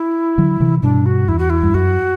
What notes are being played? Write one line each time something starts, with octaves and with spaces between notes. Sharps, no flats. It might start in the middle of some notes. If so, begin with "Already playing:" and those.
Already playing: E4
D3 F#3
C3 E3
G2 B2 D4
F#4
E2 E4
F#4
E4
G2
F#2 F#4